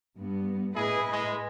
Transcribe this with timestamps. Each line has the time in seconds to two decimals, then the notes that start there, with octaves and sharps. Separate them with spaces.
0.16 G2 B3
0.75 A2 E4 G#4 B4 D#5
1.12 G#3